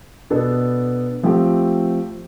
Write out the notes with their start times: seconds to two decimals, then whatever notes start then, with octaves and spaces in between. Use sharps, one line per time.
0.30 B2 B3 D4 A4
1.23 F3 A3 C4 G4